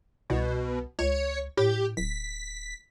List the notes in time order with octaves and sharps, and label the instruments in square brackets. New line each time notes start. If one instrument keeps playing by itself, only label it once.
[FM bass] C2 [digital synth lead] B2
[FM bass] C#2 [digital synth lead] C#5
[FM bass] A2 [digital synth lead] G4
[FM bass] D1 [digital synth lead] B6